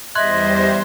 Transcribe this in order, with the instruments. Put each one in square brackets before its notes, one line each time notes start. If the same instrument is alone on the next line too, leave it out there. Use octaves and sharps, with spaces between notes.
[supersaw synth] E2 G3 C5 [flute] D#5 [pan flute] E5 [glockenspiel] C6 F#6 G#6